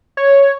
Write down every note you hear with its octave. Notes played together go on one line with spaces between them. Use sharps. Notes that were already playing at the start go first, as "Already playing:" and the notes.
C#5